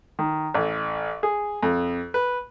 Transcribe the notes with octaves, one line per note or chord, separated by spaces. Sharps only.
D#3
A1
G#4
F2
B4